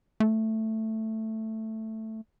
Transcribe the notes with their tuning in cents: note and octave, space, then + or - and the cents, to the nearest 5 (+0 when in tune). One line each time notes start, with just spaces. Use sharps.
A3 +5